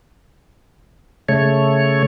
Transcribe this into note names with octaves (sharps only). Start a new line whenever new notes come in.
C#3 A3 C#5